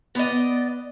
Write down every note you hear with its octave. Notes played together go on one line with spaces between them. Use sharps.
B3 D5 D#5